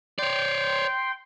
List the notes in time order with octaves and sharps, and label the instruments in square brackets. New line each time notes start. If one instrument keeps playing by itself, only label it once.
[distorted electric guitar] C#5 D5 [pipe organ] G5 C6